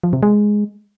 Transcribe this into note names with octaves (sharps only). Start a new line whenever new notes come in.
F3
C3
G#3